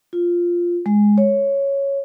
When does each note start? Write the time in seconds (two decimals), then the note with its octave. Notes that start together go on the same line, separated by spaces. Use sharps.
0.13 F4
0.86 G#3
1.18 C#5